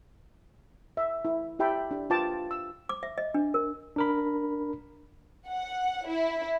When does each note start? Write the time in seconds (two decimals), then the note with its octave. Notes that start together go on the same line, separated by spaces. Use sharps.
0.97 E5
1.25 E4
1.59 E4 G4 E5 G5 A5 B5
1.91 D4 G4
2.10 F4 B4 F5 G5 A5 D6
2.51 E6
2.89 D6
3.03 E5
3.18 D#5
3.34 D4
3.54 A#4
3.96 D4 A#4 B5
5.48 F#5
6.08 E4